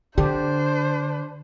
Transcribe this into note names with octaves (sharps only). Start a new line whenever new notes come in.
D3 D4 G4 C5